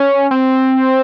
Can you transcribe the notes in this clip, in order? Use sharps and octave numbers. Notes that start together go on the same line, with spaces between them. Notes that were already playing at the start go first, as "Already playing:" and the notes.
Already playing: C#4
C4